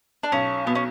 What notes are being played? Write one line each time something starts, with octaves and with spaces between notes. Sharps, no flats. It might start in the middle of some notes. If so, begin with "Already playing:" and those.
D4
B1 C#4
B2 B3
C#4